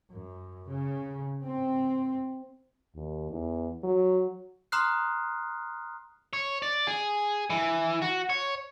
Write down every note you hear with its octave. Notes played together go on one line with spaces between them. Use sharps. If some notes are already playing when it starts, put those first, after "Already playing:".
F#2
C#3
C4
D#2
E2
F#3
A#5 C6 D#6 F6 F#6 C7
C#5
D5
G#4
E3
F#4
C#5